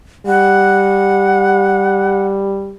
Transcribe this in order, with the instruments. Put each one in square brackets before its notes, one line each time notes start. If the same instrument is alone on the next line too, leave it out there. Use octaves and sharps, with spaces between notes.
[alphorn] G3 [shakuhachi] F#5